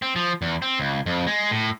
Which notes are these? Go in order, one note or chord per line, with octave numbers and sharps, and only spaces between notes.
C4
F3
E2
C4
C#2
F2
G#3
A2